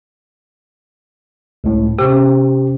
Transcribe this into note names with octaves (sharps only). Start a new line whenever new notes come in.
C#2 A2
C3 C#4 G4